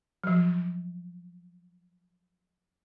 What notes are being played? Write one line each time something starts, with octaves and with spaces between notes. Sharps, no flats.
F3 F#3